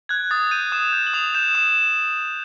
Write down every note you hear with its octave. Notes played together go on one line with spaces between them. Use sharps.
F#6 G#6
D#6 A6
G6 D#7
D#6 E7
G6
F#7
D#6 F7
G6 E7
D#6 E7